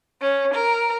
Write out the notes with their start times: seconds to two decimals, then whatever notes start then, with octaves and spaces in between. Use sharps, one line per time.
0.21 C#4
0.54 A#4